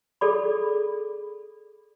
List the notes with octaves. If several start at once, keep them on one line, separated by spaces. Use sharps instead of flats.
G#4 A4 D5 B5